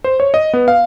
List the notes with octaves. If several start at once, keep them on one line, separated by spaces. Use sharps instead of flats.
C5
C#5
D#5
B3
F5